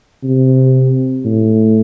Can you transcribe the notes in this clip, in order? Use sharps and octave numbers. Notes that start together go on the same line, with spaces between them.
C3
A2